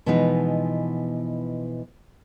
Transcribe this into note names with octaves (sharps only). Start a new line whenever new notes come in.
B2 E3 F3 G#3 B3 D#4